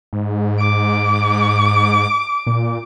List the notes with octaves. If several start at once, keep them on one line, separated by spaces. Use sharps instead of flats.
G#2
D6
A#2